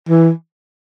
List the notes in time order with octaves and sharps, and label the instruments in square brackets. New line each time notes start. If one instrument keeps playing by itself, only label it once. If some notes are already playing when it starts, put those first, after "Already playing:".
[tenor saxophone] E3